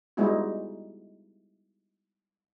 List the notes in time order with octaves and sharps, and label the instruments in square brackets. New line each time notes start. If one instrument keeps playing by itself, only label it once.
[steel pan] G3 G#3 B3 D#4 E4 F#4